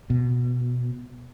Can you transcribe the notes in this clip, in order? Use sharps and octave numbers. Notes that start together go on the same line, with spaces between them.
B2